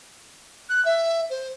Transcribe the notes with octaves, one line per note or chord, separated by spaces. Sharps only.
F#6
E5
C5